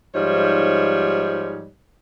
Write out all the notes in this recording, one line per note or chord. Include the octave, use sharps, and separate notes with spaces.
G#2 F3 G3 D#4 C#5